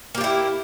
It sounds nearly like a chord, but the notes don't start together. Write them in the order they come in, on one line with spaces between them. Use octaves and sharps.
A#3 G4 F4 E4